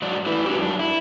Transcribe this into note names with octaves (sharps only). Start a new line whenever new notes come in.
G#2 F#3 D5
A3 E4 B4
G#3 D4 F#4 G4
F#2 D4
E4